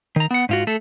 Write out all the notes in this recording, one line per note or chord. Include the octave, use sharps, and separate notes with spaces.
D#3 A#5
B3 F#5
G#2 F4 F#4
A3 A4